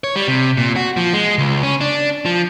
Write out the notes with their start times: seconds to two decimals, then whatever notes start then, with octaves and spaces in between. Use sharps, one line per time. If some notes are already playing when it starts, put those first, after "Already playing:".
0.04 C#5
0.16 G3
0.28 C3
0.57 A#2
0.76 F#4
0.97 F3
1.13 G#3
1.38 C#2
1.63 C#4
1.81 D4
2.26 F3